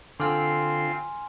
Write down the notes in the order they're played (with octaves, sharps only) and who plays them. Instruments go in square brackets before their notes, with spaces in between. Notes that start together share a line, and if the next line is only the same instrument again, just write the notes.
[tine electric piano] D3 [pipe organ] C4 F4 F5 [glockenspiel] G#5 C6 F6